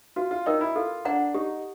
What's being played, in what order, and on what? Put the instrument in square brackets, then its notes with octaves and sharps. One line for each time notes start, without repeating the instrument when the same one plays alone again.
[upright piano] F4 [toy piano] F#4
[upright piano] F4
[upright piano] D#4 [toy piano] A#4 D#5 G5
[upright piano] E4
[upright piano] F4 [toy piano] A4
[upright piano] D4 [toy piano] D5 F#5 A#5
[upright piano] D#4 [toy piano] G4